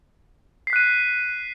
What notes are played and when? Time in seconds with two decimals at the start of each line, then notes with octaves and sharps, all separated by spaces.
0.67 C7
0.70 B6
0.73 F#6
0.76 D#7